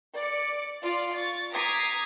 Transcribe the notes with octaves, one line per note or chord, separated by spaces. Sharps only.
D5 C#7
F4 D5
C#6 A6
A#5 D6 D#6 G#6 B6 C7